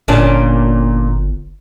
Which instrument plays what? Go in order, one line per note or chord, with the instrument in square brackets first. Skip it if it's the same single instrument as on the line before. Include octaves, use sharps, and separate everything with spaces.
[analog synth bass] G1 [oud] A#2 C#4 D4